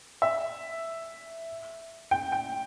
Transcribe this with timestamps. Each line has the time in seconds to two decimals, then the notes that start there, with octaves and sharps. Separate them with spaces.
0.22 E5
2.11 G5
2.32 G5